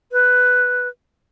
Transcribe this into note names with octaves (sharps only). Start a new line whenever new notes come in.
B4